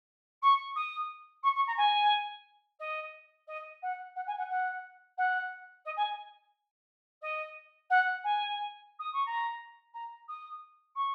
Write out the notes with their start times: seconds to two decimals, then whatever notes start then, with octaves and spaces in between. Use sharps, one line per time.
0.42 C#6
0.75 D#6
1.43 C#6
1.55 C#6
1.67 A#5
1.77 G#5
2.79 D#5
3.47 D#5
3.82 F#5
4.16 F#5
4.27 G#5
4.38 F#5
4.50 F#5
5.18 F#5
5.85 D#5
5.96 G#5
7.21 D#5
7.90 F#5
8.24 G#5
8.99 D#6
9.13 C#6
9.26 A#5
9.93 A#5
10.28 D#6
10.95 C#6